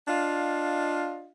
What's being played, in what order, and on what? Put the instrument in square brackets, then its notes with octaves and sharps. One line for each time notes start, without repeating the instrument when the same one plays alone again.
[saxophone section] D4 F4 D#5 F5